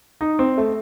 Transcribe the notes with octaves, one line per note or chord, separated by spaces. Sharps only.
D#4
C4
A3